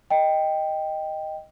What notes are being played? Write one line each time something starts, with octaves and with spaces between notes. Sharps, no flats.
D#5 G5